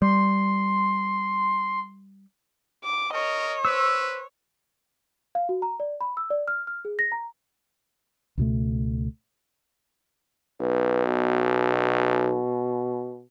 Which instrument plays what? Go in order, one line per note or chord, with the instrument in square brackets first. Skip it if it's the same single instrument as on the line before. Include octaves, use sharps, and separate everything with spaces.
[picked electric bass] G3 [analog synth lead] C6
[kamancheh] D6
[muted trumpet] A#4 [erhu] C#5 [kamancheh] D#5
[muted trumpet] B4 [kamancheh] C5 [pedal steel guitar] E6
[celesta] F5
F#4
A#5
D5
B5
E6
D5
F6
F6
G#4
A#6
A#5
[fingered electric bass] C#2 B2 A3
[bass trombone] B1 [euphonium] B4
[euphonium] B2